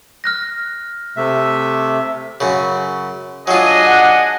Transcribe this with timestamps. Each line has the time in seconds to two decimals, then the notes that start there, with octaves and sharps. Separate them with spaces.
0.24 F6 F#6 A#6
1.17 C3 A3 E5
2.40 F#2 C#3
3.47 F#3 D4 F4 G#4 D#5
3.86 F#5